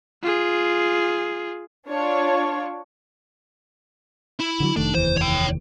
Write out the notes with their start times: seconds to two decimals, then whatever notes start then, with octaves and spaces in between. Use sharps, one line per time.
0.23 F4 G#4
1.87 D4 F4 C#5
4.40 E4
4.60 D3 F3 F#3
4.76 F1 D#3 A3 D4
4.95 F1 D#2 E3 C5
5.17 C#5 G5